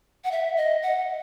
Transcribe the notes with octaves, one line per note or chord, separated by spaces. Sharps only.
F#5
E5
D#5
F#5